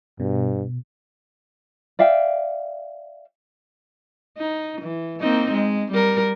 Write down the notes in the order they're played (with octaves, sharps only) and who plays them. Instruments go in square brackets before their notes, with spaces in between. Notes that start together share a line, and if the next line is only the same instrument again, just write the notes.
[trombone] G2 [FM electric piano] B2
[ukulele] D5 E5 F5 G5
[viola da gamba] D#4
E3
A#3 C4 D#4
G#3
G3 A#4